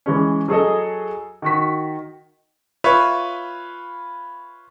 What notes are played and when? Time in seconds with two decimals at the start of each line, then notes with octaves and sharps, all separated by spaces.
0.06 E3 G#3 C#4
0.48 F#3 G#4 A4 D#5
1.42 D#3 F#4 B6
2.84 F4 B4 C#5 E5